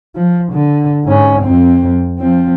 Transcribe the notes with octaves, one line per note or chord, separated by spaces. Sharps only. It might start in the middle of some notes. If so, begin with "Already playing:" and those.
F3
D3
G#2 C#4
F2 C4
F3 C4